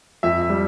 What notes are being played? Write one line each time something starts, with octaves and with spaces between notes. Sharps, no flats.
F2 E5
E5
G3